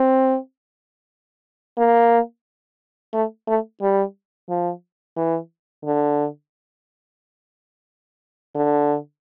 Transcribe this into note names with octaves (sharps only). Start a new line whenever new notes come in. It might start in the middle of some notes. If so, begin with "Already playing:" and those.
Already playing: C4
A#3
A3
A3
G3
F3
E3
D3
D3